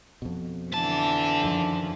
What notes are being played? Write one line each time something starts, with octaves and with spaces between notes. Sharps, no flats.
F2 B2
D3 E3 F3 A5
F#2 D#3